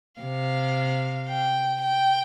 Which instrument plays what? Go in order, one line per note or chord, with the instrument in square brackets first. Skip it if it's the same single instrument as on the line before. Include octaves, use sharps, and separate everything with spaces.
[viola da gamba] C3 [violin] F5
[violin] G5
G5